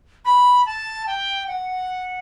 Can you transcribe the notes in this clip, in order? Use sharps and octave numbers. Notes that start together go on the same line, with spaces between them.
B5
A5
G5
F#5